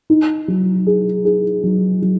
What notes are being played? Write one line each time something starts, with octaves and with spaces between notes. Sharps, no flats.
D#4
F#3
G#4
G#4
F#3
F#3